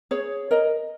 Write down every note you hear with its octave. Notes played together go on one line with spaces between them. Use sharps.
G#4 C#5
A#4 D#5